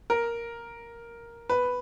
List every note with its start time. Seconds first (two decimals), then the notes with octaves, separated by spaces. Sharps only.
0.10 A#4
1.50 B4